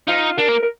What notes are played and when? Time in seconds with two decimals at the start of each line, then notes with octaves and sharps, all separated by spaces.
0.07 D#4 F4
0.38 D4 A#4
0.48 A#3
0.62 A#4